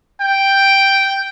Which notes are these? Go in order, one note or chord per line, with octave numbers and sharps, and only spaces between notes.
G5